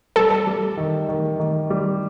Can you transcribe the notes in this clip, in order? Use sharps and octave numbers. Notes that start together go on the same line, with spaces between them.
G3 A4
G3
D#3
D#3
D#3
G3